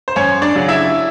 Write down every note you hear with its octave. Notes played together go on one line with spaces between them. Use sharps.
C5
F#2 C#4 C#5
D4 D5
C#3 F#3
E4 E5